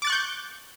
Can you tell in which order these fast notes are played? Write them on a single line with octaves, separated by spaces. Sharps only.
D6 A6 F#6 C#6 G6